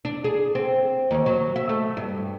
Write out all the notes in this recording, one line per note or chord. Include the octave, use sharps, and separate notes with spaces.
D4
G#4
C4
D#2
F#3
E5
A3
G2